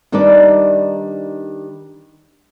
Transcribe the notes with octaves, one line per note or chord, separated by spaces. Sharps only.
D#3 G3 D4 D#4 B4 D5